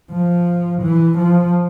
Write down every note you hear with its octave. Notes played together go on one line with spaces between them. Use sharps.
F3
E3
F3